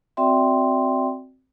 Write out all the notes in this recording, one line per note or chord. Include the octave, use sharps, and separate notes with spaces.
C4 F#4 D5 E5 G5 C6